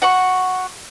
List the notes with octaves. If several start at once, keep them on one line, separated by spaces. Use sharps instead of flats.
F#4 F#5 C#6